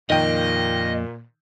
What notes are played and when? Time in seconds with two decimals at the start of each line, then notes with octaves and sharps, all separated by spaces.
0.10 F2 A#2 D#3 A#3 D#5 G5